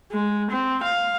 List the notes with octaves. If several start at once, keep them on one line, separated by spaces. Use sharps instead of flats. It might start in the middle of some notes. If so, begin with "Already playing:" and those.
G#3
C4
F5